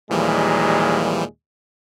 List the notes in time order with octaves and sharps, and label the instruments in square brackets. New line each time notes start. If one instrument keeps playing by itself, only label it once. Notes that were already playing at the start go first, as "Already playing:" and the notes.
[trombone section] D#2 A#2 G#3 [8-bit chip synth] E3 F3 G3